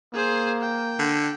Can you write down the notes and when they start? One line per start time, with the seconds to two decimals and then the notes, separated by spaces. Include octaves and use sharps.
0.13 A#3 G#4 C5
0.61 G5
0.99 D3